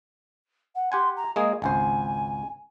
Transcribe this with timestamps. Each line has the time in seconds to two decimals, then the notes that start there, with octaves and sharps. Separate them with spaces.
0.75 F#5
0.92 G4 F#5 G#5 C6
1.16 A#5
1.36 G#3 A#3 G#4 D#5
1.62 G#1 C#2 C5 G#5